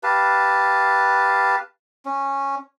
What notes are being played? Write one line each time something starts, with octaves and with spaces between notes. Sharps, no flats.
G4 B4 F5 A5
C#4